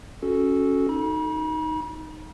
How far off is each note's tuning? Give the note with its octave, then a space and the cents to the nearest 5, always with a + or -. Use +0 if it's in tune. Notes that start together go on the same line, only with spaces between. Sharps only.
C#4 +0 F#4 +0 A4 -10
D#4 +0 B5 -45